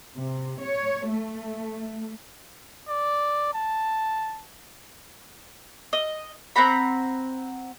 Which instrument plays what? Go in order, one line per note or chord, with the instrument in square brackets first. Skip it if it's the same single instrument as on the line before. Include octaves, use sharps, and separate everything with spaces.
[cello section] C3
C#5
A3
[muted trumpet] D5
A5
[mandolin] D#5
C4 F#5 A#5 B5